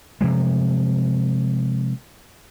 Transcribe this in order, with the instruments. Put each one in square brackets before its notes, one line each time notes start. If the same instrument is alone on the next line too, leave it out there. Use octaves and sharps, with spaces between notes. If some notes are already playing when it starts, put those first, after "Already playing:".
[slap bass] C3 F3 G#3